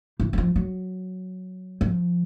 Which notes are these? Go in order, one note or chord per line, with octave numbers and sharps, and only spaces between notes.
E3
F#3
F3
F#3
F3